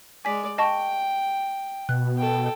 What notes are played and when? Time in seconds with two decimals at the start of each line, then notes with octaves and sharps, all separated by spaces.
0.25 G#3 D5 G#5 B6
0.58 D#5 G5 A5 C#6
1.89 B2 F#6
2.18 A4 G5